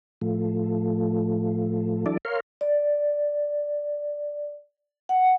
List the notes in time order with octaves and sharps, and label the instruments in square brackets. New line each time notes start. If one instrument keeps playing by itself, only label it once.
[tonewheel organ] A2 F3 A3
E3 F#3 D4 E4 A4 D5
A#4 C#5 F5 C6
[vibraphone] D5
F#5